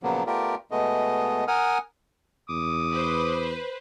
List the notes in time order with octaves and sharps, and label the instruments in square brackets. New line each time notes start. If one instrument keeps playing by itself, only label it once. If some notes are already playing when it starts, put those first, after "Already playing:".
[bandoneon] A#2 C#3 F3 F#3 A#3 B3
A3 B3 F4 G4 A#4 D5
B2 G#3 A3 B3 D#5
A#4 F#5 G#5 D#6 F6
[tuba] E2 [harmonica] D6 D#6
[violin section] B4 C5